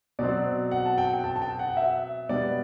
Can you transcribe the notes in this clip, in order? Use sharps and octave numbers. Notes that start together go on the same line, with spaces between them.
B2 F#3 C4 D5
F#5
A5
G5
G5
A5
A5
G5
F#5
E5
B2 G3 B3 D5